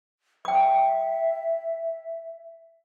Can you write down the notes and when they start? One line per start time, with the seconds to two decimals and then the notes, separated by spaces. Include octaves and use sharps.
0.45 E5 G5 D6